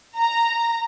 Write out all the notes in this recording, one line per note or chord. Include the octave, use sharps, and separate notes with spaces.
A#5